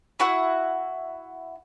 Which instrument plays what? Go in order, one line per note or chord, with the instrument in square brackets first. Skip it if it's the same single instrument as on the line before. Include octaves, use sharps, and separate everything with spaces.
[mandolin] E4 F#4 F#5